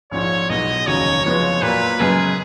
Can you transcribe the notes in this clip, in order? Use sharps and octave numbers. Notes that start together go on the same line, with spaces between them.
A#1 G#2 F3 C#5
B1 B2 G#3 D#5
F1 D#2 C#3 F#3 C#5
F#1 F2 F3 G#3 B3 C#5
A#2 F#3 A#3 B4
F#2 C#3 G#3 B3 G#4